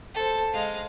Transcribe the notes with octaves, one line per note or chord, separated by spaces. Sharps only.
A4 C5
G#3 F5